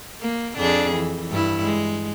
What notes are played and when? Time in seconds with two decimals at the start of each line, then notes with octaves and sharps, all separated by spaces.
0.21 A#3
0.57 F2 D4 G#4
0.93 E3
1.31 G2 E4
1.62 G#3